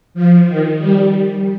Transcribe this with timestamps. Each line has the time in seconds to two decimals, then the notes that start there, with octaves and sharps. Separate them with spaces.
0.14 F3
0.46 D#3
0.78 G3